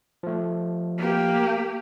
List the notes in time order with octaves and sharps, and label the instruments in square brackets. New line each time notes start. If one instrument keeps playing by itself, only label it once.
[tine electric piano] F3 A3
[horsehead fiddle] A#3 G4